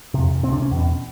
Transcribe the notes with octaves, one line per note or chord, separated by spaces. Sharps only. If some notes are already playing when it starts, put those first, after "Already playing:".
F2 C3
C#2 C3 C4 D4
C#4
E2
B2